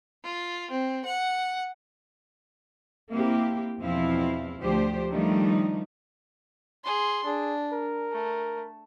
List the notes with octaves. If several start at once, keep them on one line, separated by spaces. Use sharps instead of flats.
F4
C4
F#5
A#3 C4 E4 G4
E2 B2 F3 C4 E4 F5
D2 F3 D4 G4 C5
D#3 F3 G3 A3 D4 D#4
G#4 C6
D4 G#4
A#4
A3